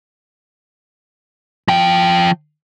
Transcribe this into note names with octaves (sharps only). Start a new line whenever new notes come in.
F3 G5